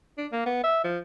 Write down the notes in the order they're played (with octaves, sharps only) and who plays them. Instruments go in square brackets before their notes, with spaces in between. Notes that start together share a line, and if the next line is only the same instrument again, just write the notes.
[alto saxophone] D4
A#3
B3
E5
F3